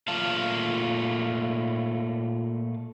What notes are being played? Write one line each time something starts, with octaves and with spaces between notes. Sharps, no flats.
A#2 A3 F4 F5 A5